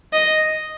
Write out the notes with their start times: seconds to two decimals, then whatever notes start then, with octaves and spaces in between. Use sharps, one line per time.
0.13 D#5